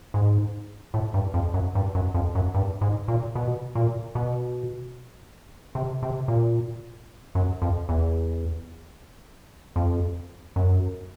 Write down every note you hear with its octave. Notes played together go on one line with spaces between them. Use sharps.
G#2
A2
G2
F2
F#2
G2
F#2
F2
F#2
G2
G#2
A#2
B2
A#2
B2
C3
C3
A#2
F#2
F2
E2
F2
F#2